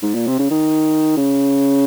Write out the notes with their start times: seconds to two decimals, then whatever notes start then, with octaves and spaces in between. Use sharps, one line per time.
0.03 G#2
0.15 A#2
0.27 C3
0.39 C#3
0.51 D#3
1.17 C#3